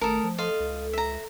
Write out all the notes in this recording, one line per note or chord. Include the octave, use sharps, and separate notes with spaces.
G#1 A3 A4 A#4 D#6
F3
A4 D#5 F5 C6
C#2
E5 A#5